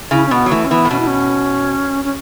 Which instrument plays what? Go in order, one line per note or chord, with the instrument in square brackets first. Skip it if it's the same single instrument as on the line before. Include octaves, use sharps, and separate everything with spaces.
[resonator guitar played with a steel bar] C#3 [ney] E4
[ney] C#4
[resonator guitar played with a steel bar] B2 [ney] B3
[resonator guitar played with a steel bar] F#3
[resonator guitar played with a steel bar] E3 [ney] A3
[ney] C#4
[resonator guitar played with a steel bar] E3 [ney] B3
[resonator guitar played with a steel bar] A2
[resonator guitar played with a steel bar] B2 [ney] C#4
[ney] E4
C#4
C#4